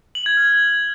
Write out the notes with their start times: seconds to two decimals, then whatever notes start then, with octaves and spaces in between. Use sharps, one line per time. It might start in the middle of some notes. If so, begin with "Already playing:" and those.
0.15 F#7
0.26 G#6
0.37 F6